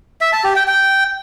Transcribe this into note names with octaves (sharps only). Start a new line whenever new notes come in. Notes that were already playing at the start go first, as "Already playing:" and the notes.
E5
A5
G4
G5
G5